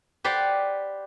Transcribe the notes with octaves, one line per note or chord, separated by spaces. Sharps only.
G4 B4 C5 D5 F#5